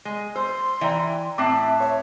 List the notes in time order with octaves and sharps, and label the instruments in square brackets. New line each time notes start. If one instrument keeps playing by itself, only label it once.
[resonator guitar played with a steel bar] G#3
[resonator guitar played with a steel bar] C5 [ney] C6 [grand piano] E6
[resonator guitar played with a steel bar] E3 [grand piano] D5 G5 A#5
[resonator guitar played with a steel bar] A2 C4 A5 [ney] E5 [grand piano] D6 F#6 C7
[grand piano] C#5 [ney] E5